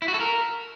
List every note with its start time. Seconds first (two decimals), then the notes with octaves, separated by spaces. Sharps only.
0.02 E4
0.08 F#4
0.14 A4
0.20 A#4